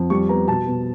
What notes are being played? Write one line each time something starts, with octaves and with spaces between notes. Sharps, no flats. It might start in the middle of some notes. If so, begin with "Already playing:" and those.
Already playing: F2
G3 C#6
B3 A#5
B2 A5
B2